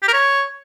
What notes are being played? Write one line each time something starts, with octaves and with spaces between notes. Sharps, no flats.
G4
A#4
C#5